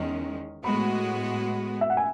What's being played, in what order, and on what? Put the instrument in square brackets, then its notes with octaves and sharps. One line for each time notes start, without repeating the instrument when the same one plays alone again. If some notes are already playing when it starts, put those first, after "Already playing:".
Already playing: [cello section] E2 D#3 G#3 C#4
[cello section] A2 G#3 B3 F#4 [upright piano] B5
[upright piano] E5
F#5
G#5